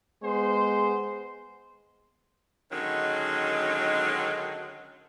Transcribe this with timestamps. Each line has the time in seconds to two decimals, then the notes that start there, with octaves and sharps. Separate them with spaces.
0.23 G#3 B3 G#4 C5 C6
2.72 D3 D#3 F#3 G#3 C#4